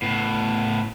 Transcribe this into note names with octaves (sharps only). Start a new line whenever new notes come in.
A2 B3